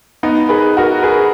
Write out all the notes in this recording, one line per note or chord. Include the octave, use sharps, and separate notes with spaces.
B3 D#4
G#4 B4
F#4 A#4
G#4 B4